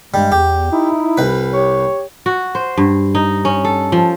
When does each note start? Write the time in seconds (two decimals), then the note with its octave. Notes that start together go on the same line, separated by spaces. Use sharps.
0.14 G2 G3 G#3
0.32 E2 G4
0.72 D#4 E4
1.17 C2 B4
1.53 G4 C#5
2.26 F#4
2.55 C5
2.78 G2
3.15 D#4
3.45 C#4
3.65 A4
3.92 F3